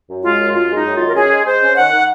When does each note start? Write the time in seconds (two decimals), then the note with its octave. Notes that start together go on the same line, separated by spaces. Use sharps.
0.09 F#2
0.24 G#3 F4
0.39 F#2
0.55 F#2 F4
0.70 G#3
0.75 D#4
0.85 F#2
0.96 D#3 F4
1.08 A#4
1.15 C#4 G#4
1.31 G#3
1.46 G#3 C5
1.61 C#4
1.77 D#3 F#5
1.92 D#3